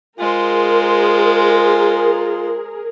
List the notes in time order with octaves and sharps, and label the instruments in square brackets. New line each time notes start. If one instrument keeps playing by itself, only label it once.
[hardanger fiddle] G#3 C5 [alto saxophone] F4 [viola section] G#4 A#4